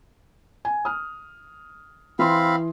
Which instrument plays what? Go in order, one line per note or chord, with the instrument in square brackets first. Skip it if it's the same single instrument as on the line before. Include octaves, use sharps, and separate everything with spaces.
[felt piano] G#5
D#6 F6
[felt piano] E3 C6 [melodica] C4 F5 B5